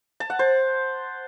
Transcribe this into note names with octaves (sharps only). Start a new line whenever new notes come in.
A5
F#5
C5